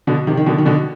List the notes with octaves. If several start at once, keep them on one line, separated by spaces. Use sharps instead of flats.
B2 D3
C3 D#3
D#3
B2 D3
D#3
B2 D3